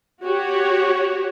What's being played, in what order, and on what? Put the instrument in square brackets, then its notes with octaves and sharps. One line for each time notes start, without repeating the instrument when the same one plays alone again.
[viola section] F#4 G4 C#5